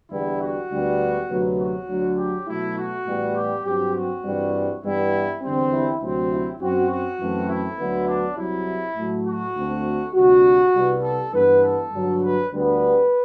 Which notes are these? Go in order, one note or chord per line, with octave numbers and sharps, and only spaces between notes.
E2 D3 G3 B3 E4
F#4
D2 D3 G3 B3
D2 C3 F#3 B3
F#4
D2 D3 F#3
G4
B2 F#3 A3 E4
F#4
A2 E3 G3 B3
G4
G2 F#3 C4 G4
F#4
G2 E3 G3 C4
G2 E3 G3 B3 E4
E2 D3 G3 C4
E4
D2 C3 F#3 C4
E4
F#2 F#3 C4 F#4
F#4
F#2 E3 A3 C4
E4
D2 D3 F#3 B3
D4
C2 C3 F#3 E4
A2 F#3 A3
F#4
D2 D3 A3 C4
D2 C3 G3 F#4
C2 C3 G3 B3
A4
G2 E3 B3 B4
A4
G2 D3 F#3
B4
D2 D3 G3 B3 B4